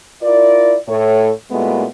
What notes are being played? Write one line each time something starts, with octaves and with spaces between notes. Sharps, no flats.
E4 F4 A#4 D5
A2 A4 C#5
A#2 G#3 A3 B3 E4 F#4